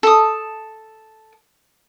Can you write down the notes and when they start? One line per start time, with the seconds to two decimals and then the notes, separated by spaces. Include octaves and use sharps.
0.03 A4 D#6